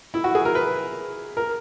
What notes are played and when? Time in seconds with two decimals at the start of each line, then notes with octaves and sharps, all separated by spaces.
0.14 E4
0.24 F#4
0.35 G#4
0.45 A#4
0.55 B4
1.37 A#4